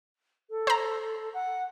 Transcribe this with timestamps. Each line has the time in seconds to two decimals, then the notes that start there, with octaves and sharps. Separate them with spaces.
0.50 A4
0.67 C5 A#5
1.34 F#5